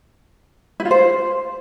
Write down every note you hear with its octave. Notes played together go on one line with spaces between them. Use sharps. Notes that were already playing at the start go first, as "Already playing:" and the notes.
E4
F4
C5